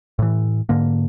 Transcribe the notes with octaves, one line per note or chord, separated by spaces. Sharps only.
A2 E3
G#2 D3 A#3